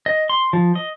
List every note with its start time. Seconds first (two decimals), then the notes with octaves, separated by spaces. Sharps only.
0.06 D#5
0.30 C6
0.53 F3
0.75 D#5